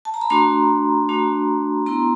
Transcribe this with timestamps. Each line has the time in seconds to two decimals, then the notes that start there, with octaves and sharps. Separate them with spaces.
0.05 A5
0.14 A#5
0.21 B5
0.30 A3 D4 F#4 A#5 C6
1.09 A3 D4 F#4
1.86 B3 E4 A#5 C6